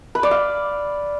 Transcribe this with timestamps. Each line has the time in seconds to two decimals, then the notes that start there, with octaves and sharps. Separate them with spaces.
0.15 B4
0.23 D5
0.31 F5